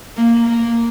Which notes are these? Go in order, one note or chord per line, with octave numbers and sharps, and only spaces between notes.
A#3
A#3